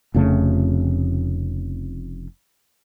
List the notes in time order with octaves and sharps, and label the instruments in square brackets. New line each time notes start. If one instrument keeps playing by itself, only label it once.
[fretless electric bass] F1 F2 C#3 A3